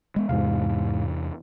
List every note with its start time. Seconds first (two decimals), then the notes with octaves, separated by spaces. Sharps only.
0.16 G#3 B3
0.29 E2 G#2 C3 F5